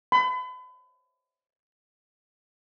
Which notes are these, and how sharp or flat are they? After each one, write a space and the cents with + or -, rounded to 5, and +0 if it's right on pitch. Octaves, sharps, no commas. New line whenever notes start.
B5 +35